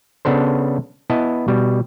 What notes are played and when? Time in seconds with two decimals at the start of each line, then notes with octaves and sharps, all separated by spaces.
0.25 C#3 B3 D4 A4 C5
1.10 B3 E4 D#5 A5
1.48 B2 G3